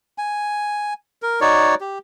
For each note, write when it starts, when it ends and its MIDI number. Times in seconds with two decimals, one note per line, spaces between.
0.18 0.93 80
1.22 1.40 70
1.41 1.75 63
1.41 1.75 66
1.41 1.75 73
1.41 1.75 74
1.81 1.98 67